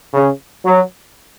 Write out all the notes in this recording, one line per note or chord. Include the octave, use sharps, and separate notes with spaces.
C#3
F#3